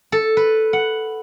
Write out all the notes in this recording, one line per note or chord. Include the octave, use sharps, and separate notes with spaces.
A4
B4
F#5